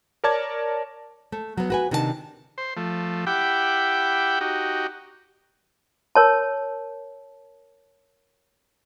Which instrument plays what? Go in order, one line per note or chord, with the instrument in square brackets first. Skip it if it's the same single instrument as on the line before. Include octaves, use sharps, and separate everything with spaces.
[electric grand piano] A#4 C#5 D5 A5 D6 G#6
[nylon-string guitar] A3
F#3 B3
F#4 B4 G#5
C3 D#3 D4 D#4 A4 A5
[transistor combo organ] C5
F3 A3
E4 G4 F#5 G5 B5 D6
D#4 F#4 G4
[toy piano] A#4 C#5 A5